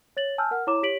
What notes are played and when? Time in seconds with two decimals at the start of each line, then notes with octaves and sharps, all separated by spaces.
0.17 C#5 A6 F#7
0.38 G#5 A5 E6 F6 G6
0.51 A#4 F#5 F6
0.67 E4 C#5 A#5 D6 E7
0.83 G4 C#5 B6 D7 F#7